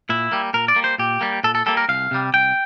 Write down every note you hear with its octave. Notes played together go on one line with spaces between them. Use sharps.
A#2 E4
G3 A#3
A#2 A#4
D5
G3 A#3
C5
A#2 G4
G3 A#3
A#2 A4
A4
G3 A#3 A4
A#4
C2 F5
C3 G3
C2 G5